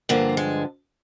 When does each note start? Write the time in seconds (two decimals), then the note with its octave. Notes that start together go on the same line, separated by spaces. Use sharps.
0.09 G2 D3 F3 A#3
0.37 G#3